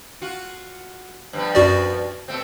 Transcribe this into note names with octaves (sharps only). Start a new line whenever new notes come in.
F4 F#4
G2 F3 B3
F#2 F#4 D5
B2 A3 C4